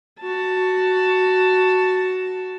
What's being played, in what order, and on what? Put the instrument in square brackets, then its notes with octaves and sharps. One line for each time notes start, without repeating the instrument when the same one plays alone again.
[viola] F#4 A5